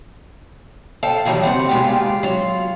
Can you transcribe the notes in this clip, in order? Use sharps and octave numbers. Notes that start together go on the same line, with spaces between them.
A4 F5 G5 A5
D#3 E3 F#3 G3 D#4
C#3 C4 F#5
A#2 D#3 G#3 B3 F4 G4
F#3 F4